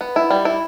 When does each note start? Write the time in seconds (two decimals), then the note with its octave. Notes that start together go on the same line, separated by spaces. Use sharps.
0.01 B3
0.16 E4
0.30 G3
0.45 E4